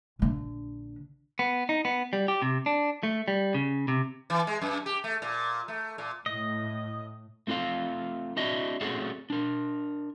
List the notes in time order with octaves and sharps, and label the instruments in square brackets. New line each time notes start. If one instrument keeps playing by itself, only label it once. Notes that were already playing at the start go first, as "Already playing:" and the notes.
[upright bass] A#1 D3
[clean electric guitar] B3
D#4
B3
G3
G4
C3
D4
A3
G3
C#3
C3
[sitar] E3
G#3
F#2
G4
A3
A#2
A3
A#2
[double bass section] A2 [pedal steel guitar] D#5
[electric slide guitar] A3 C4 F4 A4 F5
C4 D4 F#4 D#5 E5
A3 C4 C#4 F#4 G#4 A4
D4 A#4